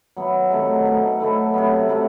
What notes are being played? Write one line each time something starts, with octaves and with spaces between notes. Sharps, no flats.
F#3 B3 E4
C3 D#3 F#3 A3
B2 A3 D#4
F#3 A3 E4 A4
C3 F#3 B3
C3 F#3 A3